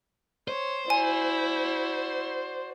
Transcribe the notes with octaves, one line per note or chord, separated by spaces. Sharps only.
C5 C#5
E4 F#4 D5 G#5